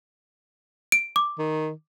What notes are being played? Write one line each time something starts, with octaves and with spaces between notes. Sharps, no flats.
D7
D6
D#3